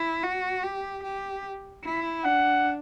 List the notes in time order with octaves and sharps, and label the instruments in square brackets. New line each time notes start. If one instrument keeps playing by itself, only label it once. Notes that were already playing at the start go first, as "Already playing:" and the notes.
Already playing: [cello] E4
F#4
G4
G4
E4
[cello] D4 [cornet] F#5